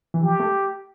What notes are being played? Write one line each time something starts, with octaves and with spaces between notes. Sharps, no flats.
E3
F3 G4
A3